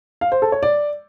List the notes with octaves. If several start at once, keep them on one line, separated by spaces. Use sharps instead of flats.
F5
C5
A4
C#5
D5